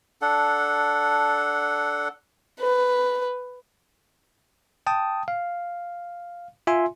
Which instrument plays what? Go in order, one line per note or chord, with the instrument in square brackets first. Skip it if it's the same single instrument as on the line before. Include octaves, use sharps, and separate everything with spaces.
[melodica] D4 A4 F#5
[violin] B4
[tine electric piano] G5 A5 D#6
F5
F4 E5 G#5 C6